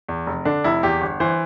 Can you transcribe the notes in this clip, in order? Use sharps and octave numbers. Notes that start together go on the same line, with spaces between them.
E2
F1
D3 D4
F1 E4
E2 G4
G1
E3 C5